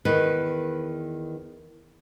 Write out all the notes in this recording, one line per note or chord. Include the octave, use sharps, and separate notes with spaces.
E2 D#3 B4